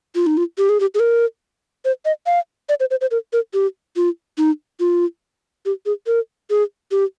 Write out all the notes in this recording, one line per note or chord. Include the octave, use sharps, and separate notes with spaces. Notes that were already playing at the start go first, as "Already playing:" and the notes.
F4
D#4
F4
G4
G#4
G4
G#4
A#4
C5
D#5
F5
D5
C5
C5
C5
A#4
A#4
G4
F4
D#4
F4
G4
G#4
A#4
G#4
G4